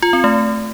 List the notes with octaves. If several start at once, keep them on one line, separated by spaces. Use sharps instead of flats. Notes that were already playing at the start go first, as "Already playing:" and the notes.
F4
C4
A3